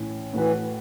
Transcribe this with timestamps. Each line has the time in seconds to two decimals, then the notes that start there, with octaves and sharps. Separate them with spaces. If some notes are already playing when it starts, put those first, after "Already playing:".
Already playing: A2 E3 C#4
0.34 A2 E3 A3 F#4 B4